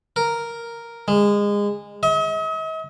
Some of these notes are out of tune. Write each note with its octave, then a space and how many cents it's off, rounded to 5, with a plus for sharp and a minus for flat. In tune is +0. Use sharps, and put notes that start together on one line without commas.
A#4 +0
G#3 -25
D#5 +45